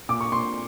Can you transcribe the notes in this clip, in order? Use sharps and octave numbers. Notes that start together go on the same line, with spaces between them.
A#2 D6
C#6
A#2 C6